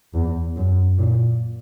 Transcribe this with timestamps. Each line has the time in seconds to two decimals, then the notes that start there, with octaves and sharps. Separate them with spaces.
0.14 E2
0.56 F#2
0.98 A#2